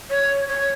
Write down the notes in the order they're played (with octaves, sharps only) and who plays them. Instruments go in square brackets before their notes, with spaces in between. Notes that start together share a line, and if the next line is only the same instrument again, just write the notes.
[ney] C#5
C#5